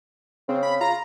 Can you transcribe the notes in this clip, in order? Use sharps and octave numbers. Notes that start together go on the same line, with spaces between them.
C#3 C4
B5
F4 A#5